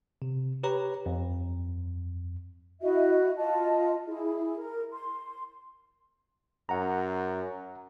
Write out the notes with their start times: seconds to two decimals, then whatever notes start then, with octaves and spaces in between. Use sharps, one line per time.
0.22 C3
0.63 G4 B4 C#5 A#5
1.06 F2
2.81 E4 F#4 D#5 E5
3.37 F4 D#5 A5
4.07 E4 G#4
4.58 A#4
4.92 C6
6.69 F#2 F#5 A#5